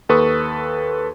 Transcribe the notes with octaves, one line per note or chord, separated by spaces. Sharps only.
D#2 A4 B4 C#6 D#6